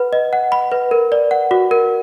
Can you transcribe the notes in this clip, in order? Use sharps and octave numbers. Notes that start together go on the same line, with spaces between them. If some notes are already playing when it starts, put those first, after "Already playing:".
Already playing: B4 F#5 B5
D#5
F#5
B5
B4
A#4
D5
F#5
F#4
A#4